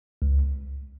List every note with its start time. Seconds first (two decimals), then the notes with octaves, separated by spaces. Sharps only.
0.22 C#2